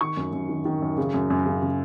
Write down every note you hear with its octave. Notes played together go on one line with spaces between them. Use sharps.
D#3 C#6
F#2
F#2
D#3
D#3
F#2
C#3
F#2
F#2
C#3
C#3